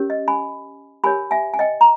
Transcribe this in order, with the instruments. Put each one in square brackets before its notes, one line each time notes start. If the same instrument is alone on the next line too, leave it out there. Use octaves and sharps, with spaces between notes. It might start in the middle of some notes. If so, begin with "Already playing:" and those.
Already playing: [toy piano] C#4 G4 A#4 C#5
D#5
G#5 B5
G4 A#4 C#5 G#5 B5
E5 G#5
G#5
D#5 G5
A#5